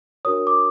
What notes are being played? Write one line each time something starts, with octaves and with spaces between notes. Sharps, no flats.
D4 F#4 A#4 C#5 D#6
D6